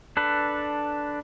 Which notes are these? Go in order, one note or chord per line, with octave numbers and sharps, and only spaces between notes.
D4 A4 B4